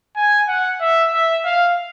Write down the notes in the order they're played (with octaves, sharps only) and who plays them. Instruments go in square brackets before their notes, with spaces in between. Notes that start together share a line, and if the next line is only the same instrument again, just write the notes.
[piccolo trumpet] G#5
F#5
E5
E5
F5